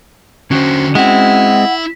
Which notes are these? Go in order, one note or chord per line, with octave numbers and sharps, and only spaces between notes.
D3 C#4 F#4 C5 G5
G#3 C4 E4 F#5